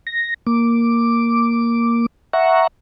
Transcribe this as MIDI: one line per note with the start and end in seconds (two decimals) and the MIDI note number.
0.07 0.34 94
0.47 2.06 58
0.47 2.06 86
2.33 2.67 76
2.33 2.67 78
2.33 2.67 82
2.33 2.67 85